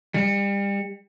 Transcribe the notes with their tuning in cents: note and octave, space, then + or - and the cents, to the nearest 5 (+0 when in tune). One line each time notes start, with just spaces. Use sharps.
G3 +30